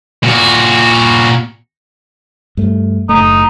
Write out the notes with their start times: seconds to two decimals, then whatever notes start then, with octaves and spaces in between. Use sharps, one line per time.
0.23 A#2 F#4
2.57 G2 A3
3.09 F#1 A2 A3 D#4